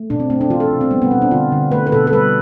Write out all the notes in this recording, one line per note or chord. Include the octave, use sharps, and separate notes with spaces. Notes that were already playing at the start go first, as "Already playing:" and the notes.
Already playing: A3
B2 D4
C4
A3 C4
D4
E3 F4
A4
C3
C4
G3 B3
B3
B2 C4
D4
D3 F4
D3
A3 B4
B4
B2 A4
A4
G3 B4